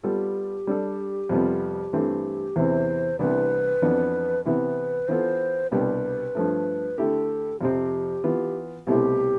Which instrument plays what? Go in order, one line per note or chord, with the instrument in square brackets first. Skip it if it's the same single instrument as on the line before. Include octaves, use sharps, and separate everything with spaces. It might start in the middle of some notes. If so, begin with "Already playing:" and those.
[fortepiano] G3 B3 F4 A4 [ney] G4
[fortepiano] G3 D4 A4
F2 C3 G3 B3 F4
G2 E3 A3 C4
[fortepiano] E2 C3 E3 [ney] C5
[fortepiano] C2 C3 E3 B3 D4 [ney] B4
[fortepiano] F2 E3 B3 D4
[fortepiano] C3 E3 B3 E4 [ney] B4
[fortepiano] E3 B3 F4 A4 [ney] C5
[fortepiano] C2 B2 G3 D4 G4 [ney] B4
[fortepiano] G2 F3 A3
[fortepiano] D3 A3 E4 G4 [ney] A4
[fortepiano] F2 C3 F3 C4 [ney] G4
[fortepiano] E3 B3 F4
[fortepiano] C2 B2 A3 C4 E4 [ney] G4